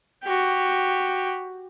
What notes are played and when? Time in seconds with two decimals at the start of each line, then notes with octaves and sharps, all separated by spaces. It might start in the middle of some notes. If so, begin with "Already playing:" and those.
0.24 F#4 G4